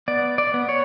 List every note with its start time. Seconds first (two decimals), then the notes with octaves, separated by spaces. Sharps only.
0.08 B3 D5
0.38 D5
0.54 B3
0.69 C#5